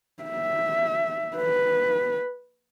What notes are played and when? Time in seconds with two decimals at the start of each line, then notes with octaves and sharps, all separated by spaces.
0.23 E5
1.37 B4